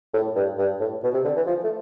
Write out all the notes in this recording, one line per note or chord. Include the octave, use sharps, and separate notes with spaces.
A2
G2
G2
A2
B2
C3
D3
E3
F3
A3